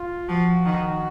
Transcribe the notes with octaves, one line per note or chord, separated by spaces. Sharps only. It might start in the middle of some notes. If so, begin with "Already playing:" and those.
Already playing: F4
F3 F#4
D#3